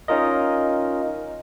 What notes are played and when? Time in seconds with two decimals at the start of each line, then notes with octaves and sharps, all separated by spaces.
0.08 C#4 D#4 F4 A#4 D#5